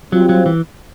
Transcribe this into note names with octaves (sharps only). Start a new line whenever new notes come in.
F#3 G3 C4 F4
F#3
E3